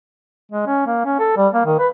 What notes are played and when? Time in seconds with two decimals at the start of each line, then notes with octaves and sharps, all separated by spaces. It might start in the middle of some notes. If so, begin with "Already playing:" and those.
0.52 G#3
0.67 C#4
0.86 A#3
1.05 C#4
1.19 A4
1.37 G3
1.54 A#3
1.66 D#3
1.79 B4